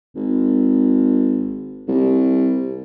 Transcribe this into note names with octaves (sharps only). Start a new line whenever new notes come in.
G#1
C2